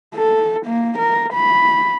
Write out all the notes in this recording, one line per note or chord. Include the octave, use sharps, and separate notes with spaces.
A4
A#3
A#4
B5